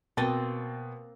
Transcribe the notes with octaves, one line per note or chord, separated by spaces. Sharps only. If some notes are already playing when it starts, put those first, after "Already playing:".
B2 A#3 C4 D#5 G5 A6